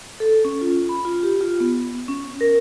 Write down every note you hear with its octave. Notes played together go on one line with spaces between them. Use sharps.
A4
C#4
F4
B5
F4
G4
F4
B3
C#4
A#4